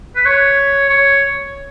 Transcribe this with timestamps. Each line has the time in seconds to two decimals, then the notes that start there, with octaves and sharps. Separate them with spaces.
0.16 B4
0.26 C#5
0.89 C#5